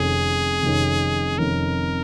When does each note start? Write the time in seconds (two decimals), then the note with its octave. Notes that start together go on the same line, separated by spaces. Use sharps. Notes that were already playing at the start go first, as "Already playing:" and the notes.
Already playing: F1 F2 D#3 C#4 G#4
0.62 F1 F2 D#3 C#4
1.38 F1 F2 D#3 C#4 A#4